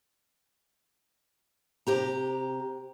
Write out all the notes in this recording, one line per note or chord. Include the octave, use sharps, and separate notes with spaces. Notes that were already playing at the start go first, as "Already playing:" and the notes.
C3 G4 A#5